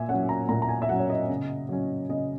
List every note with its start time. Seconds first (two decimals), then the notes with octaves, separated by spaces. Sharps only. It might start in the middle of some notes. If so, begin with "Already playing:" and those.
Already playing: A#2 E5 G#5
0.09 F#3 C#4 F#5
0.29 A#5
0.49 A#2 A#5
0.62 A#5
0.69 G#5
0.82 E5
0.89 F#3 C#4 F#5
0.99 C#5
1.10 D#5
1.29 C#3
1.69 F#3 C#4
2.09 C#3 D#5